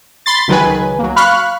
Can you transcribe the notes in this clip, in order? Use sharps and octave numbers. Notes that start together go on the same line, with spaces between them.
B5 C6 A6
C#2 D#3 F#3 G#3 B4 G#5
F#3 A#3
F5 B5 C#6 F6 F#6